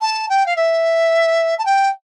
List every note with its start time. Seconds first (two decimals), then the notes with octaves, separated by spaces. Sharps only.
0.01 A5
0.29 G5
0.46 F5
0.56 E5
1.58 A5
1.65 G5